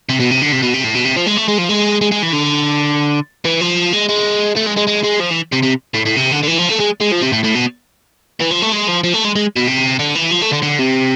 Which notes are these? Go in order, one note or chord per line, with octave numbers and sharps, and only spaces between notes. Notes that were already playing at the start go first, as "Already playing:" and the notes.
C3
B2
C3
D3
C3
B2
C3
A2
B2
C3
F3
G#3
A3
G#3
F3
G#3
G#3
G#3
E3
D3
E3
F3
G#3
G#3
A3
G#3
G#3
G#3
G#3
F3
E3
C3
C3
A2
A2
C3
D3
D3
E3
F3
A3
G#3
G#3
F3
C3
A2
A2
B2
E3
F3
A3
G#3
F3
F3
A3
G#3
G#3
B2
C3
D3
E3
F3
A3
D3
D3
C3